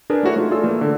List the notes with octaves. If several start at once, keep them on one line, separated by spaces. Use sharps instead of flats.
D4 G#4 A#4 B4
A3 E4 F#4 C#5
A3 D#4 F4
A3 F4 G#4 A4 D5 E6
E3 A3 A#3
D3